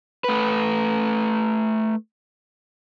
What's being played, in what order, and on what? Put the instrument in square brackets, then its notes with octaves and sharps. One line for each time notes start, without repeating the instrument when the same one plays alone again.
[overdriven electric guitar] A3 B4